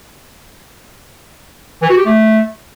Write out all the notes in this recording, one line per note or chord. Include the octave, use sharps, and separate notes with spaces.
E3
F#4
G4
A3